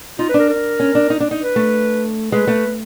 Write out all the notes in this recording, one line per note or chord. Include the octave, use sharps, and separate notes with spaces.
D#4 F4
B4
D4 A#4
A#4
C#4
D4
D#4
D4
D#4
B4
A3
G#3 B4
A3